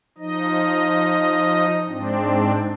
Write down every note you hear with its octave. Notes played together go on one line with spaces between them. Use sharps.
F3 D#4 D#5
G#2 C4 D4